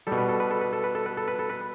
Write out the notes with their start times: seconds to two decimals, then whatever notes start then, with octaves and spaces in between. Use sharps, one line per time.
0.07 B2 G3 A4
0.17 B4
0.29 A4
0.40 B4
0.51 A4
0.61 B4
0.73 A4
0.84 B4
0.95 A4
1.06 B4
1.17 A4
1.28 B4
1.39 A4
1.50 B4